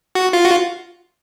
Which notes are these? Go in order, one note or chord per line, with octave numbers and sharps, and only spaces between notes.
F#4
F4
F#4
F4